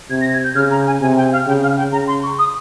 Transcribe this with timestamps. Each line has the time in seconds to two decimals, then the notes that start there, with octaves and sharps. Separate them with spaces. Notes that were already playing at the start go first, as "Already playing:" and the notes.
0.10 C3 G#6
0.21 A#6
0.33 G#6
0.44 G6
0.55 C#3 F6
0.71 A#5
0.86 G#5
1.01 C3 G#5
1.16 G5
1.32 F5
1.47 C#3 G5
1.62 F5
1.77 G5
1.92 C#3 A#5
2.07 C6
2.23 C#6
2.39 D#6